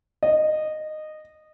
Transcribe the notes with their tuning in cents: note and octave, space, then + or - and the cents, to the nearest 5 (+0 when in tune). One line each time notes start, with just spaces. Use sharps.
D#5 -15